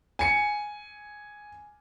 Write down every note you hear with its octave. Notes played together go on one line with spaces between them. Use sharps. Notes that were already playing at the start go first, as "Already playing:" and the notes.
G#5 C#7